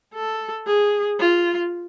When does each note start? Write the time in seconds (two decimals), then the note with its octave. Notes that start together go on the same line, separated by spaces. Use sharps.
0.14 A4
0.67 G#4
1.20 F4